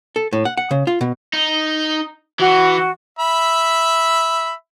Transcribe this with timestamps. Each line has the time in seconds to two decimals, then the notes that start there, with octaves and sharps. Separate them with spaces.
0.16 A4
0.33 A2
0.45 F#5
0.57 F#5
0.71 C#3
0.87 F4
1.01 B2
1.33 D#4
2.39 E3 F#4
3.19 E5 B5